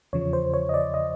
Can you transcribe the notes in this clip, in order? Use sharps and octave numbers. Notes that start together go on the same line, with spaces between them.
E2 C#3 F3 C#5
C5
C#5
D#5
D5
D#5